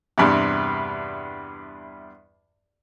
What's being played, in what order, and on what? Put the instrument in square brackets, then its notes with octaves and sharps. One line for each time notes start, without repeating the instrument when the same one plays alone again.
[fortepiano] E2 G2 C3